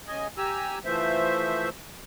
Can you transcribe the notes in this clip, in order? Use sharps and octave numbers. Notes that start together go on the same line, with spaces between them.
C#3 D#5 G#5
G4 G#5 A#5 E6
E3 F3 A3 C5 E5